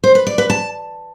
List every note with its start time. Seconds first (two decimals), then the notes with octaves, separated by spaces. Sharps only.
0.04 C5
0.15 B4
0.27 D5
0.38 B4
0.50 A5